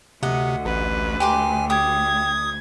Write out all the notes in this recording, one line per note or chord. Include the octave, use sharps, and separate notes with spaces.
D2 C3 D#5 F#5
A1 B4
G4 G#5 C6 D6
G4 D#6 G#6